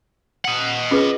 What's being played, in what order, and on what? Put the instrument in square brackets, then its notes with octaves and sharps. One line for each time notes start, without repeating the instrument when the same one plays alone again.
[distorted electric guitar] D#5 F#5
[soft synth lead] C#4 [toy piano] F4 G#4 B4